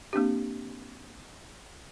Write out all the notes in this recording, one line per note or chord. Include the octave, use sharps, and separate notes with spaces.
A#3 C4 D4 G4